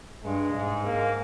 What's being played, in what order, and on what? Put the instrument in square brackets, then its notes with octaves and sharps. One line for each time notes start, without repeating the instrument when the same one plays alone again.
[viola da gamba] G2 [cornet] G#3
[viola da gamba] G#2
[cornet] A#3